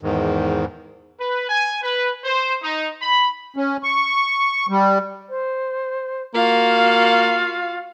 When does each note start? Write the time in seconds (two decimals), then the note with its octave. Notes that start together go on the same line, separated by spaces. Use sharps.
0.01 E2 G#2 D#3
1.20 B4
1.49 G#5
1.83 B4
2.24 C5
2.63 D#4
3.02 B5
3.56 C#4
3.83 C#6
4.69 G3
5.30 C5
6.34 A#3 F4 F#4 F5